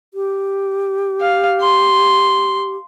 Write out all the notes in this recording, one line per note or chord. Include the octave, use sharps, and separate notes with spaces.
G4
F5
C6